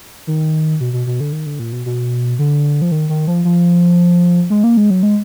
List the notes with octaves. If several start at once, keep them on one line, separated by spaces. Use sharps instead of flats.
D#3
B2
B2
B2
D3
D#3
D3
A#2
B2
B2
D3
F3
D#3
D#3
F3
F3
G#3
A#3
G#3
F#3
G#3